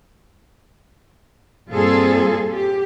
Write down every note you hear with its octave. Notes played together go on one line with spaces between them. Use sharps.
G2 A#2 C4 F4 G#4 A4
G4